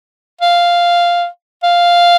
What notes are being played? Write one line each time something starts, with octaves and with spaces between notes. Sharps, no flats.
F5
F5